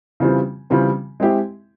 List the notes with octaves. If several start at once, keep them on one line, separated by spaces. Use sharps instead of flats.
C#3 E3 G3 C4 F4
C#3 E3 G3 C4 F4
G#3 C4 E4 G4